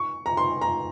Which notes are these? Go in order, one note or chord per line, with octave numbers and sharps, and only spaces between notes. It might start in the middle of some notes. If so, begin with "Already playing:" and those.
Already playing: C#6
A#5
C6
A#5